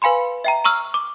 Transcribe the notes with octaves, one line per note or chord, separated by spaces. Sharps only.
B4 F5 G#5 B5 C6
E5 G5 A#5
A#5 C#6 E6 F6
D6